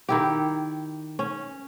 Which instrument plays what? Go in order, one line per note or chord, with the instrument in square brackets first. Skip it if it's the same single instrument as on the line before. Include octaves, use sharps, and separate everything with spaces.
[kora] D#3 E4 G4
C#4